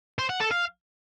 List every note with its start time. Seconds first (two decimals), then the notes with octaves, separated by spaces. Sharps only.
0.19 C5
0.29 F#5
0.40 A4
0.51 F5